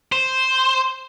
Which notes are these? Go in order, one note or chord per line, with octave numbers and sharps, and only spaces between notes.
C5